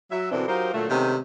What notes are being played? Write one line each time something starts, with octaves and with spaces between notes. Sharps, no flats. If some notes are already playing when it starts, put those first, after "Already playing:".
F#3 E5
F#2 B2 D3 E3 C4 D4
F#3 D#4 F4 G4 A#4 C5
A#2 D3 F#3 A3
C3 D#3 G#3 A3 B3 C#4